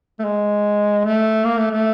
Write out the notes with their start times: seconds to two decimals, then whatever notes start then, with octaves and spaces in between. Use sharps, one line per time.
0.19 A3
0.24 G#3
1.04 A3
1.44 A#3
1.57 A3
1.70 A3